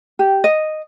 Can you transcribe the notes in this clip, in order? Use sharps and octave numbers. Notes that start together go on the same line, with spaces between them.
G4
D#5